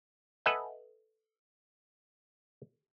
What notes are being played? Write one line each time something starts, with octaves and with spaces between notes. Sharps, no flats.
A4 B4 D#5 E5 F#5 G#5